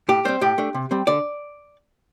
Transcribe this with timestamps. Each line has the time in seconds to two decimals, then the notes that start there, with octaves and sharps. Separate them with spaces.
0.09 A2 G4
0.25 G3 C4 C5
0.41 A2 G4
0.58 A3 D4
0.74 C3
0.91 G3 C4
1.07 D3 D5